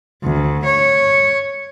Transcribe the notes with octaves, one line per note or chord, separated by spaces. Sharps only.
D2
C#5